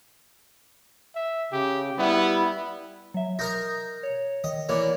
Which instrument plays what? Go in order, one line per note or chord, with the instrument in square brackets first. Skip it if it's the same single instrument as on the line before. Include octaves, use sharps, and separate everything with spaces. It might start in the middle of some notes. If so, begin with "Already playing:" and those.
[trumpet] E5
[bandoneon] C#3 [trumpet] G4
[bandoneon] G3 E4 [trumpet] B3
[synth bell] F#3 E5
[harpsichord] D#4 A#4 A#5 [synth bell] D#6 G6 A#6
[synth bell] C#5
[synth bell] D#3 [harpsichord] D#5
[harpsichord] E3 A#3 [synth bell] C#5 D5 D6